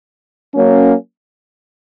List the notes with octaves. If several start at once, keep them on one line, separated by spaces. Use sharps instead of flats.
F#3 A#3 C#4